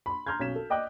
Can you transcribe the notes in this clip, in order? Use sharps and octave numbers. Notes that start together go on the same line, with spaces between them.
B5 C6
A#5 C6 F6 G6 G#6
B1 C#4 G#6 B6 E7
A4
D5 D#5 G5 D6 F#6